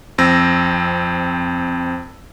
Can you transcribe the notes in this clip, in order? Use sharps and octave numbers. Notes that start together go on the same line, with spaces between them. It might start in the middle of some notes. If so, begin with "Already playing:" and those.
F2 C4 E6 A#6